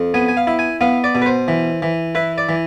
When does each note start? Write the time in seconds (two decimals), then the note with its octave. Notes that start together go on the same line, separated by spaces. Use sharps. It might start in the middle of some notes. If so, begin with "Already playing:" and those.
Already playing: F2
0.14 B3 G#5
0.29 G#5
0.37 F5
0.47 E4
0.59 G#5
0.81 B3 F5
1.04 D5
1.15 B2
1.22 B4
1.26 C5
1.48 E3
1.82 E3
2.15 E4 B4
2.38 D5
2.49 E3